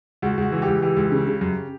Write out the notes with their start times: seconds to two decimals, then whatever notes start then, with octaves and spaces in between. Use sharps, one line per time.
0.22 C#2 F#4
0.38 C#2 F#4
0.52 E3
0.62 G4
0.67 C#2
0.82 E3 G4
0.97 C#2
1.12 C#3
1.27 C#3
1.41 F#2